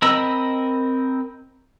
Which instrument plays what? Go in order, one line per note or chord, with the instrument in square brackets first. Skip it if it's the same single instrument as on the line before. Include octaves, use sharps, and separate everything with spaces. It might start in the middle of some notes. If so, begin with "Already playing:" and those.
[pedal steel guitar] C4 A#4 D#5 B5 E6